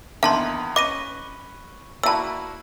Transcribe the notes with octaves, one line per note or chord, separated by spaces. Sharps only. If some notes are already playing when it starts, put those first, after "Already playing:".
E2 D#3 A#3 D4 E4 E5 A5 C6
C#4 B4 D#5 D6 A#6 D#7
A#3 E4 F#4 D5 E5 A5 B5 E6